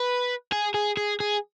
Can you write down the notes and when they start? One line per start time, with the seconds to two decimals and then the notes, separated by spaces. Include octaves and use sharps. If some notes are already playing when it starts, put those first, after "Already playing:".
Already playing: B4
0.52 G#4
0.74 G#4
0.97 G#4
1.20 G#4